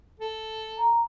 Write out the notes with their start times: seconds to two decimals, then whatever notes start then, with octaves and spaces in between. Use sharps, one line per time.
0.19 A4
0.78 A#5